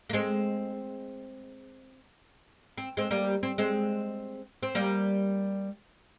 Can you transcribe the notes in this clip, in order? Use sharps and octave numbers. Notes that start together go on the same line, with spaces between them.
A#3
G#3 C4
C4
G#3 C4
G3 A#3
C4
G#3 C4
C4
G3 A#3